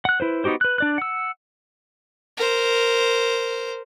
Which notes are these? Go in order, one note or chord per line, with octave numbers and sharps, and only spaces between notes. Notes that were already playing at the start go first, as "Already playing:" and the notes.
F#5 F#6
E4 B4 C5
B3 D#4 F#4 G4 C5
B4 F#6
D4 D5 F#6
F#5 E6
A#4 C5